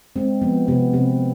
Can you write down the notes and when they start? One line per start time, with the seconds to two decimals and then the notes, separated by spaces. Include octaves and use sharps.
0.16 G#3 C4
0.42 F3 B3
0.68 C3 B3
0.93 C3 C4